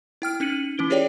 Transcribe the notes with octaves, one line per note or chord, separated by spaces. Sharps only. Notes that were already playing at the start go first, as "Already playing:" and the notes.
E4 G5 F6 D7
C#4 D#4 C#7 D#7 F#7
E3 C#4 E4 D7 G7
F4 G4 G#4 C#5 D5 G5